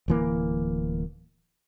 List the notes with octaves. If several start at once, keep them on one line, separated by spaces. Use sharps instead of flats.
D1 E3 A#3